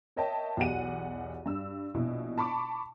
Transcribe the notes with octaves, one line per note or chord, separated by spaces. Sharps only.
A#4 C#5 D#5 E5 G5 A5
B1 E2 G4 F#5 D#7
G2 E6
A#1 B2 E4
A5 B5 C#6 D6